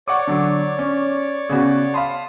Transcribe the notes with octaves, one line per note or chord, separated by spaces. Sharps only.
C#5 D5 F#5 C#6 D6
D3 F#3
C#4
C#3 B3 F#4
F5 A5 B5 C6 D#6